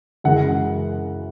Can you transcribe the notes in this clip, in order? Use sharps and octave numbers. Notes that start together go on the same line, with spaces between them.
F#2 C#3 E3 G#3 F#5